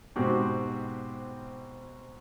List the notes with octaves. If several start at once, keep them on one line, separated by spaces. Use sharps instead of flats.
G#2 B2 C4 F#4 G4